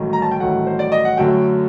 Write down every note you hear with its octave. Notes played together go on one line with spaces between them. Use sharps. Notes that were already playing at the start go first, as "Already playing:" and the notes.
Already playing: A1 G2 D#3 F#3 A3
A#5
A5
G5
A1 G2 D#3 F#3 A3 F#5
C5
D5
D#5
F#5
F#2 D3 F#3 A3 G5